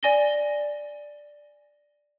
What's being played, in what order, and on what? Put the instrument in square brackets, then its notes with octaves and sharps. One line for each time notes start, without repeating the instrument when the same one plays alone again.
[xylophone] D5 G#5 A#6 G7